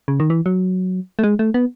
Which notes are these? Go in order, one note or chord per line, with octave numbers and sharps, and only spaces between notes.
C#3
D#3
E3
F#3
A3
G#3
A3
B3